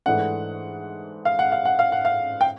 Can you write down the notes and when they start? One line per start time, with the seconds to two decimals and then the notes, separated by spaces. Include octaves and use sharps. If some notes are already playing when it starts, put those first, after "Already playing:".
0.06 G#2 E3 A3 D4 F#5
1.25 F5
1.39 F#5
1.52 F5
1.65 F#5
1.79 F5
1.92 F#5
2.05 F5
2.41 G5